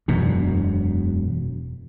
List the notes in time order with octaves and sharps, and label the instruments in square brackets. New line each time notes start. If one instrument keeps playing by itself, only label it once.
[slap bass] E1 F#2 B2